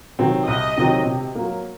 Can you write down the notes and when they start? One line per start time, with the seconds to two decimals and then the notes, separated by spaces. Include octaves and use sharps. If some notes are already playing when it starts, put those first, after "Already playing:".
0.19 C3 D#3 F#3 C4
0.48 C2 D#5
0.78 C3 D#3 F#3 C4
1.06 C3
1.35 F#3 A#3